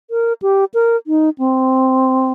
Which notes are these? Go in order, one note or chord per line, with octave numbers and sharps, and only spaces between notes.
A#4
G4
A#4
D#4
C4